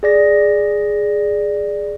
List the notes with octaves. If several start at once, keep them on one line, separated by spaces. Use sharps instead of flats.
G#4 D5 A#6